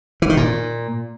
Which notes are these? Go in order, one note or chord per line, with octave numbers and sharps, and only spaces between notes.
E3
D#3
A#2